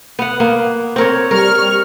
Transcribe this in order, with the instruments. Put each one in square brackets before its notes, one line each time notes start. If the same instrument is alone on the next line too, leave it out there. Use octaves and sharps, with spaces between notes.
[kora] B3 F#5
A#3 B3
C4 A#4 C#5
[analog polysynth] G3 C#6 F6 [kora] A#4